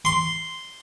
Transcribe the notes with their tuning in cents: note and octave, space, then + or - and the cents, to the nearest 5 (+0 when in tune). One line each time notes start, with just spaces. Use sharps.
C6 -5